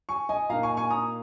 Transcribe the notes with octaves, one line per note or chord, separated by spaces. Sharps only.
G#5 C#6
D#5 G#5
A#2 A#3 D#4 F5 A#5
G#5 C#6
G#5 C#6
A#5 D#6